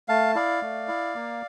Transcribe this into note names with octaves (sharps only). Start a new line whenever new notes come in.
A3 F5 A5
E4 D5 F5
A3
E4
A#3